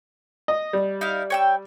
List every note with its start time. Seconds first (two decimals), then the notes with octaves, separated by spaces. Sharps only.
0.48 D#5
0.73 G3
1.01 D#4 E4 F5
1.30 C#5 G5 E6